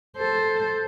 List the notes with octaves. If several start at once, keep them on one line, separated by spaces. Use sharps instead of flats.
A4 C5